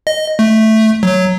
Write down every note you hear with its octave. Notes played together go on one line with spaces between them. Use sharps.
D#5
A3
F#3